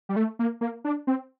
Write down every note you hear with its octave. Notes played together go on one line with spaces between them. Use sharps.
G3
A3
A#3
A#3
D4
C4